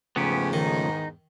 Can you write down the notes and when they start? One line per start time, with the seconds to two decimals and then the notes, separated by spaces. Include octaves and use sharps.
0.16 E2 G#2 C#3 F3 A3 B3 C#4 G4
0.53 D#3 D#4